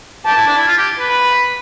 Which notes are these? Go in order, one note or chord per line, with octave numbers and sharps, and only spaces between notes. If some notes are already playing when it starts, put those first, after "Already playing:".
G4 A5
E4
D4
E4
F4
G4
B4
B5